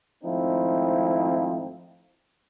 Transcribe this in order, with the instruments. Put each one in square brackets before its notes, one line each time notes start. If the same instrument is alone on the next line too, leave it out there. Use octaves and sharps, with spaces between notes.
[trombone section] G#1 F3 A3 C4 D#4 E4